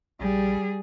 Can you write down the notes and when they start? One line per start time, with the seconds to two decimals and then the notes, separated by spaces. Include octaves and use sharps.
0.20 A#1 G3 G#4